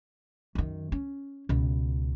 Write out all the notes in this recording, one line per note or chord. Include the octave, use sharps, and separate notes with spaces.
F#2 D#3
C#4
C#2 B2